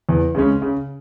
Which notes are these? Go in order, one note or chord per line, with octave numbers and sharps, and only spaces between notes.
E2
C#3 G#3 C#4
C#3